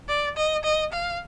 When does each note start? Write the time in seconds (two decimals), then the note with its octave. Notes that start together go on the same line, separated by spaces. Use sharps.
0.08 D5
0.36 D#5
0.64 D#5
0.93 F5